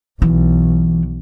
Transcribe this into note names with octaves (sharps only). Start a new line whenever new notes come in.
B1 E3